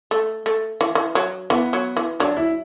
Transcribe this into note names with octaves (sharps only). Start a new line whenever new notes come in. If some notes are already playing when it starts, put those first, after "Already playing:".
A3
A3
E3
E3
F#3
E3 B3
F#3
E3
F#3 D4
E4